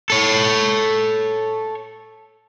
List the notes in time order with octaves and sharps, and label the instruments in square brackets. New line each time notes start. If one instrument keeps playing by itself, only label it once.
[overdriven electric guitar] A4 C#5